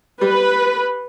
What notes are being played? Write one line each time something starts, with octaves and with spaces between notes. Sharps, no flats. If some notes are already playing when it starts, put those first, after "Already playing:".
G3 B4